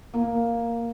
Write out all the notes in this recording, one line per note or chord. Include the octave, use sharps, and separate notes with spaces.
A#3